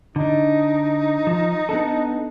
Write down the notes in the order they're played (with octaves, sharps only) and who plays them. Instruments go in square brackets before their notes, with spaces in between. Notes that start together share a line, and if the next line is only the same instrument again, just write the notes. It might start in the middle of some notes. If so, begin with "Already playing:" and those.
[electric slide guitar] D3 D4 [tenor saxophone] D#4
[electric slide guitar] F3
B3 D4 A4